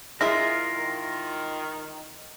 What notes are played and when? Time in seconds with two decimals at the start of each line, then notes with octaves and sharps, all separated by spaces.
0.21 G#3 E4 F4 G#4 A#4 E5
0.73 D#3